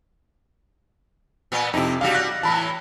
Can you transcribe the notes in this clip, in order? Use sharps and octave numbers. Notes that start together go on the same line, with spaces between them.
A#2 B3
F2 C3 D#4 E4
C#3 G3 F#4 F5
F#6 A#6
A2 E3 A5 B5